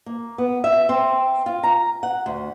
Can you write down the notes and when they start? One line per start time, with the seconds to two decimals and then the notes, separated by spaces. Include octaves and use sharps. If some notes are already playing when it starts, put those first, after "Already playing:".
0.06 A#3
0.38 B3
0.64 E5
0.89 C4
1.46 F4
1.63 A#5
2.03 F#5
2.26 D2